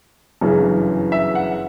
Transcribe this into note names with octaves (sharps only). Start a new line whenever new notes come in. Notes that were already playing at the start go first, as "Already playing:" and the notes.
G1 F#2 C#3 E3
E5
F#5